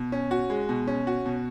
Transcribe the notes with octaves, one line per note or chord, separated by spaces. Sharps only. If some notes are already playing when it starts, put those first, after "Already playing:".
Already playing: B2
C#4
F#4
G#3
B2
C#4
F#4
B2